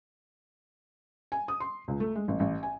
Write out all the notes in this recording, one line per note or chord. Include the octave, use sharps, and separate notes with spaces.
G#5
D#6
C6
C#2
A3
G#3
A1
A1
G#5